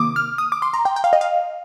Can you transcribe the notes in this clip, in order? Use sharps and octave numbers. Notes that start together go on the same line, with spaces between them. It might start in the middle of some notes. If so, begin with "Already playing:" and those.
Already playing: C3 D#3 A#3 D6 D#6
F6
D#6
D6
C6
A#5
G5
G5
F5
D#5
F5